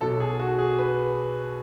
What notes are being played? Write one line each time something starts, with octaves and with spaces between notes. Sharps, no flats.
B1 B2 F#3 A4
G#4
F#4
G#4
B4